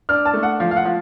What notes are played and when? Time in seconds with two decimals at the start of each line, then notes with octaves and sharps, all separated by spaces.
0.09 D4 F6
0.25 A5
0.34 A3
0.43 F#5
0.60 F3 F5
0.71 F5
0.77 F#5
0.85 F3